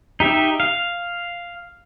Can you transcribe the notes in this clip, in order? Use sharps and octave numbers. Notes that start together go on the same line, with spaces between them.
D#4 G4 E5
F5